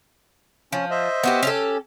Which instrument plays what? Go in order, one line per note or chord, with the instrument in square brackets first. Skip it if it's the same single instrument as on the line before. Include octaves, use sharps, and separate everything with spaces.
[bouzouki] F3 [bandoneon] C#4
[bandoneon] C5 D#5 E5
[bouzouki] B3 F#4 G4
C#4 G4 A4